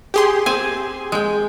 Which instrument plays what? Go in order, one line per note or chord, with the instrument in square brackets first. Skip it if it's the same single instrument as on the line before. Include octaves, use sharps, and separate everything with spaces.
[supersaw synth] G4 G#4 C6
[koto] C4 G#5
G#3 G5